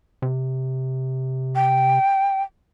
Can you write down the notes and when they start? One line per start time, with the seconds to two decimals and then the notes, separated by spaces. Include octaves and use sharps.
0.22 C3
1.55 G5